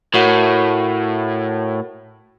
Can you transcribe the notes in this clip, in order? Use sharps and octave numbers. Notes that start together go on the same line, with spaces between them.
A2 F#4 A#4 F#5